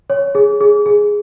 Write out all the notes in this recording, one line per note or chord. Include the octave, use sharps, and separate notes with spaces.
C#5
G#4
G#4
G#4